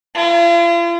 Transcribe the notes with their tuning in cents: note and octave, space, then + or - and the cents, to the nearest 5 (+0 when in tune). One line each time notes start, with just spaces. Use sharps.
F4 -40